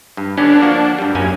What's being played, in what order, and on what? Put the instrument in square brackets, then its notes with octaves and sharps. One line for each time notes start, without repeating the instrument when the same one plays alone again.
[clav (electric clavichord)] G2
[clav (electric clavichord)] D3 B3 C#4 [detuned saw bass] D4
[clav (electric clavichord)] F3 A#3 F#4
G2 G3
[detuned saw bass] F#2 [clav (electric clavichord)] A#3 C#4 G#5